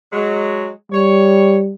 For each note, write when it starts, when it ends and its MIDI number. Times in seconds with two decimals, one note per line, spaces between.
0.13 0.69 54
0.13 0.69 56
0.92 1.75 55
0.92 1.56 73